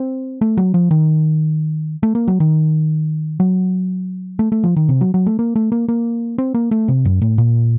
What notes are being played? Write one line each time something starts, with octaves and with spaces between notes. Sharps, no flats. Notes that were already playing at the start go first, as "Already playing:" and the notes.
Already playing: C4
A3
F#3
F3
D#3
A3
A#3
F#3
D#3
F#3
A3
A3
F3
D#3
C3
F#3
F#3
A3
A#3
A3
A#3
A#3
C4
A#3
A3
C3
F#2
A2
A#2